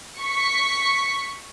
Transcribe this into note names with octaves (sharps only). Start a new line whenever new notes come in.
C#6 B6